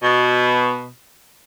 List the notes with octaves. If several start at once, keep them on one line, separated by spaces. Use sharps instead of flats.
B2